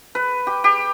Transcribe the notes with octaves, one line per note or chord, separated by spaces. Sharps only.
B4
G4
G4